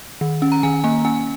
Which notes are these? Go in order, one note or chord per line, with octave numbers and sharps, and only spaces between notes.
D#3
C#4
A#5
D#3 G#5
A#3 G#5
C#4 G#5